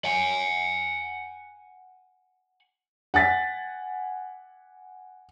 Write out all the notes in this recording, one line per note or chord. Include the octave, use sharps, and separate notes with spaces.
F#5 G#5
F#5 G#5 A6 B6